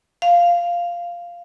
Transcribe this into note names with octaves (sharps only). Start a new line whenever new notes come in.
F5